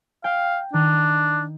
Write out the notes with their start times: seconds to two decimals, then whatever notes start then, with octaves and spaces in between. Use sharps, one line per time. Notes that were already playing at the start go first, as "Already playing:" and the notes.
0.24 F5 G5
0.73 D#3 D4